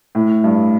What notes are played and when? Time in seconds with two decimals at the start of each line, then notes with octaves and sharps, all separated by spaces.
0.15 A2
0.44 G2